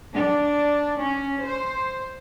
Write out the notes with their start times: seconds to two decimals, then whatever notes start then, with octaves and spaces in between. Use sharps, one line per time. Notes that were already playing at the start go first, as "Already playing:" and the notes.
0.14 D4
1.00 C#4
1.43 C5